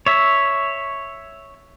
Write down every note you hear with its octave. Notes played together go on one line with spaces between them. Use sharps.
C#5 E5